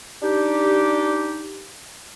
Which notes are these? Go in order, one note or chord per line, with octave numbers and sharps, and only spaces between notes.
D4 D#4 G4